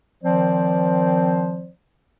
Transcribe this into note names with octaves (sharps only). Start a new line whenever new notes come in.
D#3 F3 C4 C5 D5